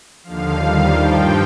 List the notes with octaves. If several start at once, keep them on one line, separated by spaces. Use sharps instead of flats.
D#2 D3 F3 F5
D#2 D#3 G3 F5
G2 F3 G5